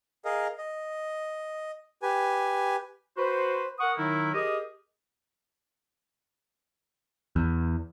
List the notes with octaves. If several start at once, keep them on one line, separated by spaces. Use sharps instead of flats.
G#4 A#4 D#5 F5
D#5
G4 B4 G#5
F#4 B4 C5
A#4 F#5 C#6 D#6
D#3 F#3 D#4 E4 A#4
G4 G#4 A#4 D#5
E2